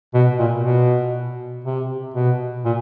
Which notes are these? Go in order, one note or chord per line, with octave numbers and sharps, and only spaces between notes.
B2
A#2
B2
C3
B2
A#2